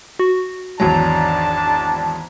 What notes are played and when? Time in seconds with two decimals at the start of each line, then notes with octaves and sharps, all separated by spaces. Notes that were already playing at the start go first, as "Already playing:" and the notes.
0.19 F#4
0.80 G#1 E2 F#3 D4 A5 A#5